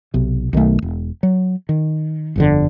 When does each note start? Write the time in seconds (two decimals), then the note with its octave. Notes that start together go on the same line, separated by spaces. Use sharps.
0.14 B1 C3
0.53 B1 D#3 F3 A3
0.82 E1
1.23 F#3
1.69 D#3
2.36 G1 F2 D3